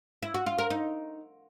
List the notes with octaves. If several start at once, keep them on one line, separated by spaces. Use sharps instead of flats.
E4
F#4
F4
A#4
D#4